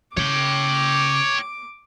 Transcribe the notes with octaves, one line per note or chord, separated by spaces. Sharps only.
C#3 C#5 G5 D6